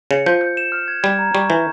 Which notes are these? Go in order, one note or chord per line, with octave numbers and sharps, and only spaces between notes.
C#3 C#7
F3 G6
G6
E7
F6
G#6
G3 G#6
A#5
G3 C#6
E3 G6